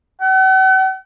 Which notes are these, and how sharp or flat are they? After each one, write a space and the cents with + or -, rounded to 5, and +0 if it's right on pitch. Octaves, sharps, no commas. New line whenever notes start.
F#5 +40